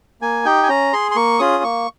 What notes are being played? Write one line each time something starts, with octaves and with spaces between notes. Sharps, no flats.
A#3 G#5
D#4 G4 G5
G#5
C#4 A#5
G#4 C6
C6
A#3 C#6
C#4 F4 G#4 D#6
A#3 C#6